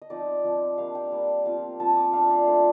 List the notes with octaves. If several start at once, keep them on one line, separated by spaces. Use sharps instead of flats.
D#5
F3 C4 D#4 D5
F3 C4 D#4
G3 A#3 D4 F5
G5
G3 A#3 D4
F3 C4 F4 F5
F3 C4 F4 A5
D#6
D6
G5
A3 D4 F4 F5
D5
A3 D4 F4 C5